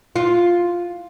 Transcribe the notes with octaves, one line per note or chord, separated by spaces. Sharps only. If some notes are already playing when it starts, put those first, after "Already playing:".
F4